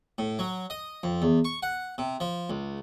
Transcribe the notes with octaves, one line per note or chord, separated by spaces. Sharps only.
A2
F#3
D#5
F2
E2
C#6
F#5
C3
F3
C#2